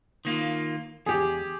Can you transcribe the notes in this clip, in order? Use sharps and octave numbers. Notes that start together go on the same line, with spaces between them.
D#3 A#3 F4
E2 G4 G#4